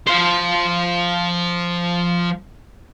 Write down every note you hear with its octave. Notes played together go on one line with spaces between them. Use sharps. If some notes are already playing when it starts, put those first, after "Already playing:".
F3 C5